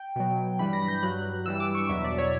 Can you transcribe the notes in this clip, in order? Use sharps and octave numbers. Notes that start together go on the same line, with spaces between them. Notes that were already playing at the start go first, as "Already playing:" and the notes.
Already playing: G5
B2 F#3
G2 E3 G3 B5
A#6
G6
G2 F#3 F#6
G2 E3 G3 E6
D6
C#6
E2 B2 F#3 E5
D5
C#5